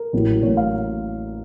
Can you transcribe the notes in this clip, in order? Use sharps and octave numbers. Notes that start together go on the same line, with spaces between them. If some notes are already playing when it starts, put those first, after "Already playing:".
Already playing: A#4
A1 A2 F#3 A#3
A1 A2 F#3 A#3 C#5
F5